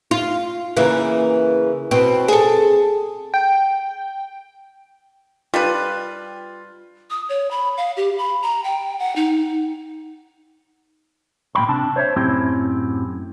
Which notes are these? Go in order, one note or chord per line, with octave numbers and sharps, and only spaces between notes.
F4
C#3 E3 A#3
B2 C4
G#4 A4
G5
G3 D4 F4 B4
D#6
C#5
B5
F5
G4
B5
A#5
G5
F#5
D#4
A#2 A#3 G5 B5 C6
C3 D4 A5
C5 C#5 D#5 E5 A5
F#2 A2 C4 E4 G4 C6